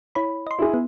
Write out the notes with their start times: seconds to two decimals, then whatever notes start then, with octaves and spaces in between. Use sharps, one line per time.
0.15 E4 C#5 B5
0.47 D#5 C6
0.59 E4 G#4
0.74 B3